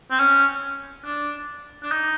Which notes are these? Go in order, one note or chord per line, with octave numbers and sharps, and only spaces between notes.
C4
C#4
D4
D4
D#4